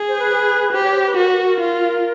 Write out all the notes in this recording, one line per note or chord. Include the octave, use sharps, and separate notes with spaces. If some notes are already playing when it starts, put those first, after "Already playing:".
Already playing: G#4
C5
B4
G4 C5
C#5
C5
B4
F#4 A#4
A#4
A#4
F4